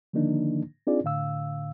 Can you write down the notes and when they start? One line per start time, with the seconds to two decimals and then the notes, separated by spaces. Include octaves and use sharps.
0.13 D3 D#3 F3 A#3 D4 D#4
0.87 C4 D4 D#4 F4 G#4 D5
1.04 A2 D3 F5 E6